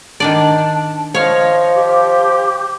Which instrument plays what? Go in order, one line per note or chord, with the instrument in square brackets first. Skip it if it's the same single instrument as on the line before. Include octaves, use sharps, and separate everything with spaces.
[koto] D#3 D4 D5 [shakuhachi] A5
[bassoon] F3 [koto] C#5 F5 [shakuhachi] D#5
[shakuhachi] G4